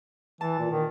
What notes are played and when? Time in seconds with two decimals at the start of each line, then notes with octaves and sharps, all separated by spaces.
0.41 E3 A5
0.59 A#2
0.71 D#3